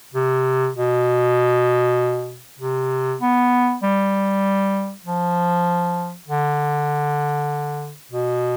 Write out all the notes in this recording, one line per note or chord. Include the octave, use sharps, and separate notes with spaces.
C3
B2
C3
B3
G3
F3
D3
B2